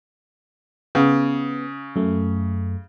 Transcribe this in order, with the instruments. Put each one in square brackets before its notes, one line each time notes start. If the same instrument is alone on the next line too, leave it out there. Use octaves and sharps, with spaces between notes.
[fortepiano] C#3 [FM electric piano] B3
[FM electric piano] F#2 A3